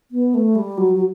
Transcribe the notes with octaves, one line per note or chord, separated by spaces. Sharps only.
B3
A3
G3
F#3
F#3